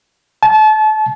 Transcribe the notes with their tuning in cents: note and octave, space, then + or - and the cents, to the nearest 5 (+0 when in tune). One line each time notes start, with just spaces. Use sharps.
A5 -30